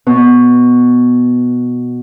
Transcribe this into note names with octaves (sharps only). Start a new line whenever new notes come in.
B2